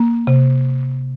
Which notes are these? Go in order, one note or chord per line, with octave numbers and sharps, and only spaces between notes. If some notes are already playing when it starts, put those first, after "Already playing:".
Already playing: A#3
C3